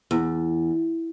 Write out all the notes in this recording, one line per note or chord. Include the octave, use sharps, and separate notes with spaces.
E2